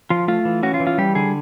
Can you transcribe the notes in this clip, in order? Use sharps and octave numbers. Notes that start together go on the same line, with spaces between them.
F3 F4
A3 F4
E3
C#4 F#4
F4
E3
F4
G3 G4
D3 G#4